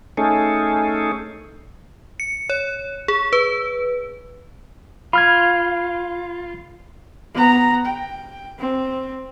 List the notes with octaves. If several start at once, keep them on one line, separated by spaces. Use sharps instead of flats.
A3 C#4 D#4 G#4 A4
C#7
C#5
G#4
B4
F4 B5 F6 G#6
B3 A#5
G5
C4